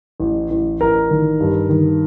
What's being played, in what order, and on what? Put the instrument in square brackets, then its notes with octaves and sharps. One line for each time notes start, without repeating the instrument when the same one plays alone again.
[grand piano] A1
A1
A1 A#4
D#3
G2
D#3